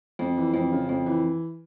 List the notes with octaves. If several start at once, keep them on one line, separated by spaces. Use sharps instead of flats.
F2
E3
F2
C#3
F2
E3